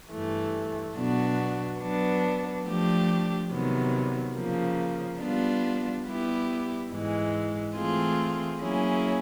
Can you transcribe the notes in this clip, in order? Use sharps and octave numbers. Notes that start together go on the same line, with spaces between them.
G2 E3 A3
B2 F#3 B3 D4 F#4
F#3 B3 D4
F3 A3 D4 G4
C3 D#3 F#3 B3
C#3 F3 A#3
G3 B3 D4 F4
G3 B3 E4 G4
G#2 E3 G#3
E3 A3 C4 F4 G#4
F#3 A#3 C#4 E4 G#4